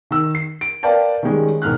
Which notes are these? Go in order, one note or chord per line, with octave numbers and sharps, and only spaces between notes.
D#3 E6
C7
D7
A#4 B4 D5 F5 G5 A5
D#3 G3 G#3 C#4
E1 G#2 F6 F#6